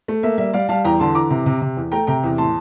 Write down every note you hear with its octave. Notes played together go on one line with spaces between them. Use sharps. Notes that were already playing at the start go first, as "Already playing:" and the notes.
A3
A#3 E5
G3 E5
G3 D5 F5
G3 F5 A5
E2 G5 A#5
D3 A5 C6
E3 A#5 D6
C3
C3
C3
E2
A3 G5 A#5
C3 G5 A#5
E2
A2 A5 C6